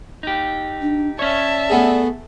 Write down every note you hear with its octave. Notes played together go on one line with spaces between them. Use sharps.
D#4 G4
D4
C#4 C#5 D5 E5 A5
A3 B3 G#4